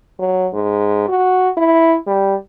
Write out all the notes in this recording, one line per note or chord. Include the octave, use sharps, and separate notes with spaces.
F#3
G#2
F#4
E4
G3